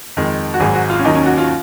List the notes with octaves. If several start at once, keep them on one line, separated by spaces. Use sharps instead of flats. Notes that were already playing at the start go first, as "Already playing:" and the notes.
F2 D#3 G#3
F#4
G#1 G#2 F#3 G#4
F#4
F4
C#4
D#2 D#3 F#3 D#4
C#4
F#4
F4